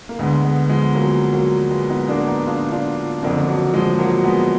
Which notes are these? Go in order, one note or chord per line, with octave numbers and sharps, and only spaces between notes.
A#3
D2 D3 G#3 B3
G#3 B3
F3 G#3
F#3 A#3
F#3 A#3
G#3 B3
B3 D#4
A#3 D4
B3 D#4
D4 F4
D4 F4
F#1 F2 D3 A#3 D4
F#3
F3 G#3
G#3
F#3 A#3
G#3 B3